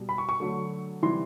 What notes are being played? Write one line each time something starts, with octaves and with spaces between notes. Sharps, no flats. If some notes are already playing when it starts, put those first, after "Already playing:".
Already playing: B2 G3
B5
C#6
C#6
D3 F#3 A3
C3 E3 G3 C6